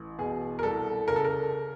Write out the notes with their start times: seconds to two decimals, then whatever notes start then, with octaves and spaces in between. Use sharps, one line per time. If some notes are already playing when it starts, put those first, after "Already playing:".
Already playing: A1
0.18 B2 G#4
0.59 A#4
0.63 C2 A4
1.08 C#3 A#4
1.16 A4
1.25 A#4